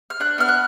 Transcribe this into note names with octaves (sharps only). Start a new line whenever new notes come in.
F6
D4 F#6
B3 F6
F#6